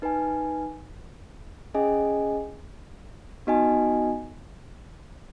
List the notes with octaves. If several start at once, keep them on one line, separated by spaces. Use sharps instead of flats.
D#4 B4 G#5
C#4 G#4 D#5 G#5
B3 D#4 F#4 D#5 G#5